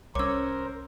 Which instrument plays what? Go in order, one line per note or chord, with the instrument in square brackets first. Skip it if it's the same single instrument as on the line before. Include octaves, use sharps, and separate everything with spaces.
[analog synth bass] C2 [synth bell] C#4 C#5 [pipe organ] A#4 C5 [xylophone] D6 E6